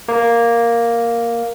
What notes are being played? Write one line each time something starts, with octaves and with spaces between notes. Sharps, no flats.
A#3